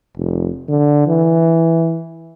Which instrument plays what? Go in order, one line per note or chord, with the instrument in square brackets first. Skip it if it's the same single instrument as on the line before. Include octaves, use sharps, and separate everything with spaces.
[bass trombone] F1
D3
E3